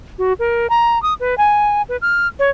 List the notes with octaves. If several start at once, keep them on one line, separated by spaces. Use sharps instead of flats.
F#4
A#4
A#5
D#6
B4
G#5
B4
F6
C#5